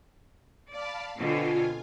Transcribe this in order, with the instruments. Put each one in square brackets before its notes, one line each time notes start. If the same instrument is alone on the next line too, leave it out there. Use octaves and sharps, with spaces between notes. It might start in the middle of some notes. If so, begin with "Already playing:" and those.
[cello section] D5 [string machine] F5 A5 B5
[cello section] B2 D3 C4 [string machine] F4 G#5